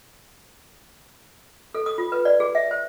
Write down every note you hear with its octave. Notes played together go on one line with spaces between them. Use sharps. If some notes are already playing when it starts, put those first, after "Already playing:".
A4
D#6
F4
B4
D5
G#4
E5
C5